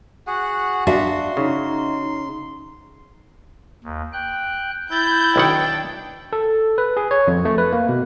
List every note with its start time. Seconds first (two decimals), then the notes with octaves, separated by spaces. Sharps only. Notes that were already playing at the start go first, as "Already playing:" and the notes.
0.27 F#4 G#4 F#5
0.87 D4 F#4 E5 F5 C6
1.37 C#3 D#4
3.84 D#2
4.13 G5 F#6
4.91 E4 G6 A6
5.36 B1 D#3 D4 F#5 G5
6.33 A4
6.78 B4
6.97 G#4
7.11 C#5
7.28 F2
7.45 A3
7.58 B4
7.73 A#3
7.89 B2